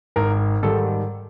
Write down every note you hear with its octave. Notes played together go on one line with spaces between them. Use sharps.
G#1 A#4
G#2 D#3 G3 A4